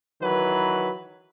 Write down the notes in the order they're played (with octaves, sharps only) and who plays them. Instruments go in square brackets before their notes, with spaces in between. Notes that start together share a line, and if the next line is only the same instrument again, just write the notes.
[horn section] D#3 E3 F#3 B4